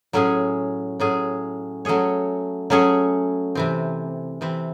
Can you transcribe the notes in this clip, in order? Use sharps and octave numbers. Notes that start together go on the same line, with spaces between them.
A2 F#3 C#4 G#4
A2 F#3 C#4 G#4
F#3 A3 C#4 G#4 C#5
F#3 A3 C#4 G#4 C#5
C3 E3 C4
C3 E3 C4